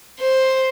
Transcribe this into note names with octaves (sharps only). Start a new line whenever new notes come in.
C5